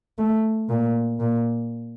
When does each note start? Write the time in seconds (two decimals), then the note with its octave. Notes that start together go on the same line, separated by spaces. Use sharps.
0.18 A3
0.69 A#2
1.20 A#2